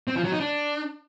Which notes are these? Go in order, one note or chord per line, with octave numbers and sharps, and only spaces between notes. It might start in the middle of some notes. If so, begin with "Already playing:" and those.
C4
F3
F#3
D#4
D4